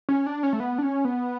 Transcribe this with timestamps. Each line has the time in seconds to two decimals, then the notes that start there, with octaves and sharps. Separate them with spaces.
0.09 C#4
0.27 D4
0.43 C#4
0.53 A3
0.60 B3
0.78 D4
0.83 C#4
1.05 B3